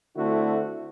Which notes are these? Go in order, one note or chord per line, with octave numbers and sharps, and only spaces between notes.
D3 A3 C4 E4 F#4